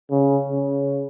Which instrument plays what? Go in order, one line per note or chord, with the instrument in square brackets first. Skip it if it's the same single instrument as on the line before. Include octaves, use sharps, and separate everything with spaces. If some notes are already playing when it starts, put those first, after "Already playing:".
[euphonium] C#3
C#3